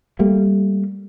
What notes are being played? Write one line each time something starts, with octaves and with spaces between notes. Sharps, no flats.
G3 A3 A#3